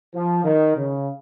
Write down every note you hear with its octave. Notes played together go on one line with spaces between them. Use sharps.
F3
D#3
C#3